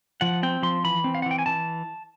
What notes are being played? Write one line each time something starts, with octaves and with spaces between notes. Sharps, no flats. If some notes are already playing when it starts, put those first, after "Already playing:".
F3 F#5
C4 G5
F3 C6
E3 B5
C4
F5
F#5
E3
G5
G#5
E3 A5